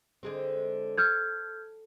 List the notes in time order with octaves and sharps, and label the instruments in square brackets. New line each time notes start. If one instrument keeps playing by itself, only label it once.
[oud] D3 G#3 C4
[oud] A4 [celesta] F6 G6 G#6